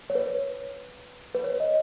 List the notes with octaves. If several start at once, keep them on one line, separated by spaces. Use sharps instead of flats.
C#5
B4
B4
C#5
D#5